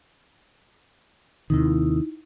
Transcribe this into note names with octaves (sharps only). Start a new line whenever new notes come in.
D#2 C3 D#3 D#4 E4